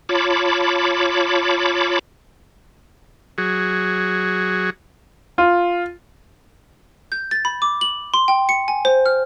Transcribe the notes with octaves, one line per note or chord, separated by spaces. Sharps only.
F4 C#5 A5 B5 D6
F#3 F#4 G#4
F4
G6
A6
B5
D6
F#7
C6
G5
C#7
G#5
C5
F6